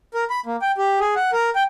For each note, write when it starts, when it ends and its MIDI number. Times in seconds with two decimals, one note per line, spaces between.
0.14 0.24 70
0.30 0.40 83
0.46 0.56 58
0.62 0.72 79
0.78 0.99 67
1.00 1.15 68
1.16 1.31 78
1.33 1.50 70
1.56 1.63 79